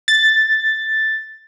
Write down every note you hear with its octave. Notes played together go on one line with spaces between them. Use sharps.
A6